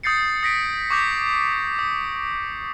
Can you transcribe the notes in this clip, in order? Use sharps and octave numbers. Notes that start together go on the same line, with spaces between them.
D#6 G6 A6 C7 C#7
D#6 A#6 B6 D7
C#6 D6 G6 B6
D#6